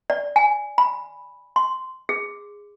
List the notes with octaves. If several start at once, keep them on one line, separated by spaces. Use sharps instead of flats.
D5
G#5
B5
C6
G#4